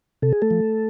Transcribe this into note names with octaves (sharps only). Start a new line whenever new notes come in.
C3 A4
G#4
A3 A4
F3